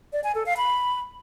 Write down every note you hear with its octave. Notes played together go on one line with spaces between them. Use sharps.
D5
G#5
A4
F5
B5